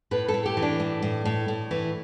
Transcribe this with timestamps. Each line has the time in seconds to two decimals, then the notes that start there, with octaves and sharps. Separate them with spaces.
0.11 A2 B4
0.28 A4
0.34 A2
0.45 G4
0.57 E3
0.62 D4
0.80 A2
1.02 A2
1.25 A2
1.48 A2
1.71 E3